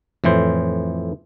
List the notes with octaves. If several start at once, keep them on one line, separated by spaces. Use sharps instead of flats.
F2 A2 E3 C5